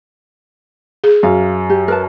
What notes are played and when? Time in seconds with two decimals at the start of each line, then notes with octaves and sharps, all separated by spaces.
1.04 G#4
1.23 F#2 F5
1.70 G4
1.88 A#4 B4 A5